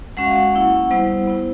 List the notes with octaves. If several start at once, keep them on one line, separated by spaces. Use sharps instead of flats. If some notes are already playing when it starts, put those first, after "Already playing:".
G#3 C#4 F#4 F#5
F5
F#5
A#3 C#4 E4
G3 B3 E4 C5
B3 E4